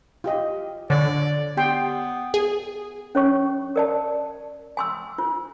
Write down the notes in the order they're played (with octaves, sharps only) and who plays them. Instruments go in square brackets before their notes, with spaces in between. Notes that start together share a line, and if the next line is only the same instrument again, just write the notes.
[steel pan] F4 G4 D#5
[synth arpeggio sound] D3 [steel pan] C#5 [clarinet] D5
[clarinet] B3 [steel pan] G4 G5 C6
[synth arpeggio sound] G#4
[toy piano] C#4 C#5 C#6
A#4 D5 A5
G#5 C6 E6
F4